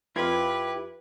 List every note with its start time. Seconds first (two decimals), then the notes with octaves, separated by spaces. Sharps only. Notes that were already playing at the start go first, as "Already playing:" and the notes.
0.16 F2 E4 F4 G4 B4 G#6